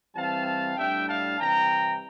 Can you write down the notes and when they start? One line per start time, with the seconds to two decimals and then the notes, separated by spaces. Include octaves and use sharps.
0.16 E3 G3 C4 F5 A5
0.77 A2 G3 D4 E5 G5
1.08 F5 A5
1.40 C3 E3 G3 G5 A#5